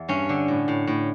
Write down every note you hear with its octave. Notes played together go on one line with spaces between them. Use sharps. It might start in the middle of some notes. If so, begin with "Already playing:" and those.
Already playing: E2
G2 C#4
D3
A2
A2
A2